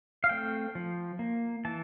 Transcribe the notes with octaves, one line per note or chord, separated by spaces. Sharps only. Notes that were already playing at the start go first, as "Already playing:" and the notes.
F5
A3 C4 G5
F3
A#3
E3 A5